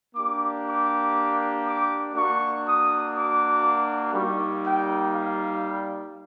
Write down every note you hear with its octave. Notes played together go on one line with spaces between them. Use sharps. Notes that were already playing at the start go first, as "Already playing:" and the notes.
A#3 D4 G4 D6
D6
D6
A#3 D4 F#4 C#6
D#6
D6
G3 A#3 D#4 C#6
G5
F5